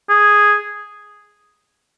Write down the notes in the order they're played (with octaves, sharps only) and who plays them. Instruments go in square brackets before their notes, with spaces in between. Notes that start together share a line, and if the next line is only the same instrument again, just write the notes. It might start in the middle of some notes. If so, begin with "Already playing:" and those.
[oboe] G#4